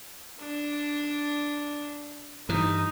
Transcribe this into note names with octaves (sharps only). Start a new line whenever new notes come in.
D4
G2 E3 D#4